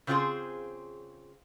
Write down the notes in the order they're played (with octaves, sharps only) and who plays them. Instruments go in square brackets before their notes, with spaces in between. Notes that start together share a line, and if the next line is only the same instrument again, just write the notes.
[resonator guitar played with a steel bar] C#3 C4 F4 G4 G#4 C5